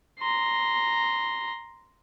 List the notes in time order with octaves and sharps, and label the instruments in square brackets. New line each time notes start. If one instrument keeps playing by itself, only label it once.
[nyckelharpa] A#5 C6